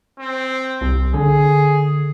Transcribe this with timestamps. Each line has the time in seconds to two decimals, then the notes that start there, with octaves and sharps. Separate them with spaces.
0.19 C4
0.81 C2
1.14 D3 G#4